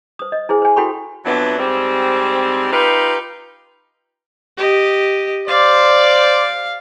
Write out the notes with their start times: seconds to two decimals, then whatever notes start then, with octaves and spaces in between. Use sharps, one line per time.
0.19 C5 D#6
0.32 D#5
0.49 E4 G#4 C5 G#5
0.62 C5 G#5
0.76 E4 F#4 A4 G5 B5 C#6
1.25 F2 E3 F#3 B3 D4
1.58 G#2 G3 C4
2.72 D#4 F4 G4 B4
4.57 G4 D#5
5.48 C5 D5 F5